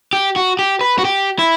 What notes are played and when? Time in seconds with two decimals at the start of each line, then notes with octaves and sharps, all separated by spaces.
0.13 G4
0.36 F#4
0.59 G4
0.81 B4
0.98 F#4
1.05 G4
1.39 E4